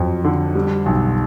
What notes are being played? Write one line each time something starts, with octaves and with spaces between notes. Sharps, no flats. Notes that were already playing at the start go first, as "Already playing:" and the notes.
Already playing: F2 F#3
D3
G3
B1